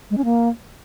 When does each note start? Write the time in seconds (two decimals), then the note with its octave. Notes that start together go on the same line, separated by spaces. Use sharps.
0.10 G#3
0.18 C#4
0.25 A#3